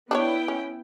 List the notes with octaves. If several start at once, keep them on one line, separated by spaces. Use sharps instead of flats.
B3 D4 E4 C5 C#5 G5
C#4